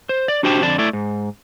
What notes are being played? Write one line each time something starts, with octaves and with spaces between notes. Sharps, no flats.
C5
D5
D4 F#4 G4 C5 G5 A5
F2 D3 D5 A5
A3 E4 D5
G#2